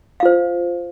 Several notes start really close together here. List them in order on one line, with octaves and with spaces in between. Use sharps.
F5 F4 C5